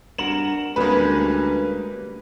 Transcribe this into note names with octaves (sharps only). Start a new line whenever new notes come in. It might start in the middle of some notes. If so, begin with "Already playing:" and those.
G2 F#4 A#4 E7 F#7
D2 G3 G#3 A#3 C#4 B4